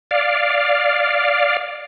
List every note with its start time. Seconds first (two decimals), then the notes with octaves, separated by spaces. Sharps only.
0.11 D5 F5